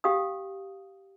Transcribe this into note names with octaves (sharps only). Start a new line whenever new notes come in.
G4 F5 G5 D#6